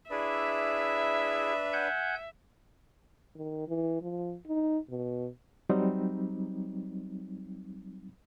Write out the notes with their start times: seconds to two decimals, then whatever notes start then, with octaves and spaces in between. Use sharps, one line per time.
0.10 D4 E4 G#4 B4 D5 E5
1.73 F#5 G#5 G6
3.36 D#3
3.68 E3
4.02 F3
4.48 D#4
4.90 B2
5.69 F#3 G3 C4 D#4